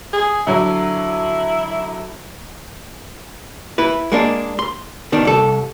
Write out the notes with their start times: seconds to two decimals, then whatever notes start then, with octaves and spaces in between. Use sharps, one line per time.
0.13 G#4
0.47 D3 F#3 E4
3.78 E4 B4
4.12 G#3 A#3 D4
4.59 C6
5.12 B2 D#3 D4
5.25 C2 A4